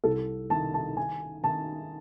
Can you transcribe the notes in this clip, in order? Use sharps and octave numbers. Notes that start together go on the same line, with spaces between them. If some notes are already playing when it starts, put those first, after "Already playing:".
C2 A4
D#3 A5
A5
D#3 G#5
D#3 A5